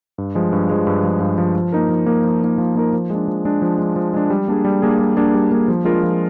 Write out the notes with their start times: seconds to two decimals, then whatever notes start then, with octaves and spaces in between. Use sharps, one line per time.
0.18 G2
0.35 F3 G#3
0.53 G2
0.70 F3 G#3
0.87 G2
1.03 F3 G#3
1.21 G2
1.38 F3 G#3
1.56 F3
1.72 A#3 D#4 A#4
1.89 F3
2.06 A#3 D#4 A#4
2.24 F3
2.41 A#3 D#4 A#4
2.58 F3
2.76 A#3 D#4 A#4
2.93 F3
3.10 G#3 D4
3.28 F3
3.45 G#3 D4
3.62 F3
3.78 G#3 D4
3.96 F3
4.14 G#3 D4
4.30 G3
4.48 A#3 D4 G#4
4.65 G3
4.82 A#3 D4 G#4
4.99 G3
5.17 A#3 D4 G#4
5.34 G3
5.51 A#3 D4 G#4
5.68 F3
5.85 G#3 D4 F4 A#4
6.03 F3